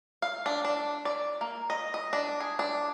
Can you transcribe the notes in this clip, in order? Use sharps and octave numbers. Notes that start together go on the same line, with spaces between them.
F5
D4
D4
D5
A#3
D#5
D#5
D4
G#4
D4